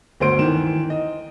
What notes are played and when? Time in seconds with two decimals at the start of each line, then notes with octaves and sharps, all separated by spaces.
0.20 G1 D2 C5 C6 D7
0.39 D#3 E3 E7
0.90 D#5